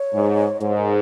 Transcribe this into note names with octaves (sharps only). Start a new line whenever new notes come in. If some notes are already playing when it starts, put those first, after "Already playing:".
Already playing: C#5
G#2
G#2 C#5
A#4